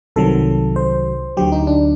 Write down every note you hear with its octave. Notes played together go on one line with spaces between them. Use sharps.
C2 C3 D#3 F#3 A4
C5
D2 D3 F#3 G4
D#4
D4